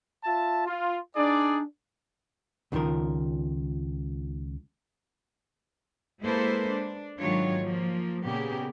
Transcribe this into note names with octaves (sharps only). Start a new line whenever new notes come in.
F4 E5 A5
F4
D4 D#4 G#4 D5
C#2 D3 D#3 F3 A#4
G#3 A#3 E4 A4 B4 C5
D4
G#2 D#3 F#3 D4 F4 C#5
F3 A#3
A#2 C#3 A#3 B3 G4 G#4